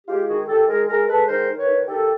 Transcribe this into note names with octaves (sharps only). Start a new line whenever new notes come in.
G#3 F4 G4
D#3 F#4 G#4
D#3 G4 A4
G#3 G#4 A#4
G#3 G#4 A#4
G#3 A4 B4
D#3 A#4 C5
D#3
B4 C#5
D#3
D#3 G4 A4